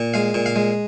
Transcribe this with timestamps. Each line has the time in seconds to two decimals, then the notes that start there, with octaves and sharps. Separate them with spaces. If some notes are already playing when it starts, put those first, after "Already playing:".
Already playing: A#2
0.14 G#3 F5
0.34 A#2
0.46 F5
0.56 G#3